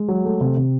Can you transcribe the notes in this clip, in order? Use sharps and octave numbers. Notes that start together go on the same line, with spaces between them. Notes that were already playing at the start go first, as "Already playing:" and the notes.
Already playing: G#3
F#3
A3
C3
C3